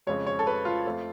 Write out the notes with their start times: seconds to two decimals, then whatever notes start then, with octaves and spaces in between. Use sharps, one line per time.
0.07 F2 C#3 G#3 C#5
0.27 C#5
0.39 A4
0.47 B4
0.65 F4
0.86 F2 F3 A3